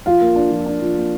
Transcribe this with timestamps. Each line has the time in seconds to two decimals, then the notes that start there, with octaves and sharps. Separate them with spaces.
0.06 F3 F4 F5
0.21 A#3
0.36 D4
0.51 F3
0.66 D4
0.81 F3
0.95 A#3